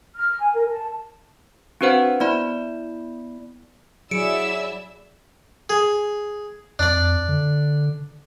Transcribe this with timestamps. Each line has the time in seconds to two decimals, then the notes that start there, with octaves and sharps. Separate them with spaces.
0.16 F6
0.40 G#5
0.54 A#4
0.70 A5
1.81 C4 D4 F#4 B4 C5 F#5
2.20 B3 E4 D5 B5
4.11 F#3 E4 G#4 D5 E5 E6 C#7 D7
5.70 G#4
6.79 F2 D4 D5
7.28 D3